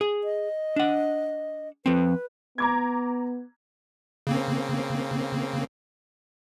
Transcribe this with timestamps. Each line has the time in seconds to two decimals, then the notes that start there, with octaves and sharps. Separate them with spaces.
0.01 G#4
0.24 D#5
0.76 D4 F#5
1.86 F3 C4 B4
2.58 B3 A#5 D6 G#6
4.27 C#3 A#3 C4